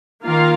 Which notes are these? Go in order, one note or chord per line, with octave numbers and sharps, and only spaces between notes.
D#3 A#3 F4 A#4 F5